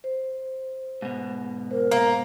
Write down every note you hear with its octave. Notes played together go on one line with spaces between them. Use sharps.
C5
G#2 B2
A#4 C5
A#3